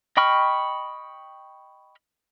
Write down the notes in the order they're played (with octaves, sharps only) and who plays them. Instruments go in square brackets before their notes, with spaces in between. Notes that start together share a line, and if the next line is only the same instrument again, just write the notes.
[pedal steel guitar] D#5 G5 B5 C#6 F6